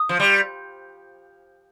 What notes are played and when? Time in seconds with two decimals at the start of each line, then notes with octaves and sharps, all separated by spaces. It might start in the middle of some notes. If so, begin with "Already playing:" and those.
Already playing: D#6
0.09 F3
0.20 G3